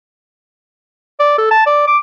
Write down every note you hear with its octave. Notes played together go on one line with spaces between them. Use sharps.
D5
A4
A5
D5
D6